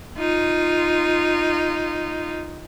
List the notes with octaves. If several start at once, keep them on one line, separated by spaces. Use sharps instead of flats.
D#4 F4